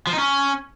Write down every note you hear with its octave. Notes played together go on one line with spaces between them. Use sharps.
F3
D#4
C#4